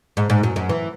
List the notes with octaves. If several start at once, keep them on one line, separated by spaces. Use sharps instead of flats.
G#2
G#2
F#2
F#2
E3